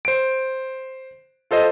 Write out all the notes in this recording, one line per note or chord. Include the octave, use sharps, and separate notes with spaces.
C5 D7
F4 A4 C5 D#5